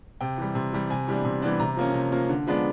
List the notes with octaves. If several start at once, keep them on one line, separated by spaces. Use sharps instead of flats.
C3 G5
E3 G3
C3
E3 G3
C3 G#5
E3 G3 B3 D4
C3
E3 G3 B3 D4
C3 A#5
F3 A#3 C#4
C3
F3 A#3 C#4
D3
F3 G#3 B3 D4